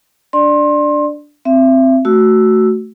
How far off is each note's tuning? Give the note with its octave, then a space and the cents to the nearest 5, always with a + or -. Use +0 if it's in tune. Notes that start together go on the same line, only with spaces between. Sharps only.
D4 +0 D5 +15 C6 +25
C4 +0 E5 +30
A3 +0 F#4 +10 E6 +0